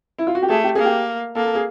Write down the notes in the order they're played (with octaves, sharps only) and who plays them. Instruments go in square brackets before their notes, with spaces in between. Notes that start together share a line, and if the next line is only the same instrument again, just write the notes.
[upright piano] E4
F4
F#4
G4
[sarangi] A3 [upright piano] G#4
[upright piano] G4
[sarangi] A#3 [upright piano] G#4
[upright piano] G4
[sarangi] A#3 [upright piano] A4
[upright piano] A4
G#4